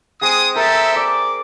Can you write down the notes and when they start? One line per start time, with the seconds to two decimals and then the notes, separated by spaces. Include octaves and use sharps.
0.21 G#3 C4 G#4 C5 D#6
0.56 G4 A4 A#4 C5 E5
0.96 D5 D6